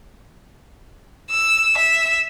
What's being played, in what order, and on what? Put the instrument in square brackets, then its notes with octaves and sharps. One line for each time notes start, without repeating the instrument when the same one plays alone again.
[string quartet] E6
E5